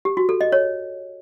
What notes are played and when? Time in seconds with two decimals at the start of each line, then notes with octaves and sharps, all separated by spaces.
0.05 G4
0.17 F#4
0.29 A4
0.41 D#5
0.52 C#5